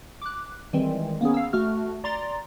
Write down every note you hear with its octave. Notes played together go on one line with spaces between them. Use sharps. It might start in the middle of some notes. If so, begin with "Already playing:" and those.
D6 F#6
D#3 E3 G3 G#3 C4
A#3 B3 C#4 G#4
F5 E6
A3 F#4 F6
D5 A#5 C6 A6